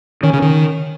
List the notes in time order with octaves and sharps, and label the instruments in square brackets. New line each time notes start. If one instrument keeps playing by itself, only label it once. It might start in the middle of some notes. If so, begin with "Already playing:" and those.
[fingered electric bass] D#3 [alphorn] C#4
[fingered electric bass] C#3
D#3